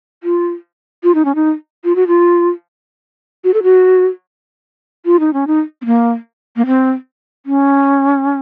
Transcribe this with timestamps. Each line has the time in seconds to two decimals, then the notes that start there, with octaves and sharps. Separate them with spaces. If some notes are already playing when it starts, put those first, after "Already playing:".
0.23 F4
1.03 F4
1.15 D#4
1.25 C#4
1.35 D#4
1.84 F4
1.96 F#4
2.07 F4
3.44 F#4
3.54 A4
3.63 F#4
5.06 F4
5.20 D#4
5.33 C#4
5.47 D#4
5.82 C4
5.86 A#3
6.56 A#3
6.66 C4
7.46 C#4